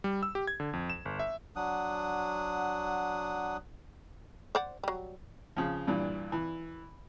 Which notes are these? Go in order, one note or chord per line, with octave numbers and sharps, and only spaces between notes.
G3
E6
G4
G#6
D3
F2
E7
G1
E5
F#3 D4 F#5 D#6
C5 D5 F#5
F#3 G3
C#3 F3
G2 A#2 E3
E3